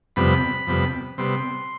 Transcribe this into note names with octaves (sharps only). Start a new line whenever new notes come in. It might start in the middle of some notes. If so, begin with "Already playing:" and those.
F2 C3 G3 B3 B5
F2 C3 G3 B3
C3 G3 B3 C6